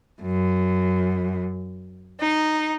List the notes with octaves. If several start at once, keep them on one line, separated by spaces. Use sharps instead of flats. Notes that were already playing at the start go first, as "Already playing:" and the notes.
F#2
D#4